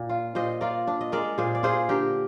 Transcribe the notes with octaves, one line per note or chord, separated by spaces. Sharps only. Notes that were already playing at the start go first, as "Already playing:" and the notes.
Already playing: A#2
F4
A#2 C5 D#5
F4 A#4 D5
D4
D#5
G#3 A#4 D5
A#2 G#4 C5
D5
F4 G#4 C5
D3 G4 A#4